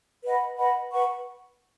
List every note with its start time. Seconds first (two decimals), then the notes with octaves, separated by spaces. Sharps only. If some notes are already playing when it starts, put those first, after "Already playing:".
0.24 B4 D#5 F#5 B5
0.57 B4 D#5 F#5 B5
0.90 B4 F#5 C#6